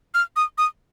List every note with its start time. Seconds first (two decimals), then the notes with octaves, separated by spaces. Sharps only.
0.14 F6
0.36 D#6
0.58 D#6